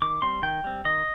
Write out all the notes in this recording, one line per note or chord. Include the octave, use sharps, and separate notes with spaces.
D#3 D6
G3 C4 C6
D#3 G5
G3 C4
D#3 D#5